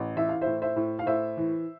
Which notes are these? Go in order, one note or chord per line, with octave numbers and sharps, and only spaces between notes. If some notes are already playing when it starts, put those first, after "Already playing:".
Already playing: A1
E3 E5
F5
A2 C5 E5
C5 E5
A2
F5
A2 C5 E5
E3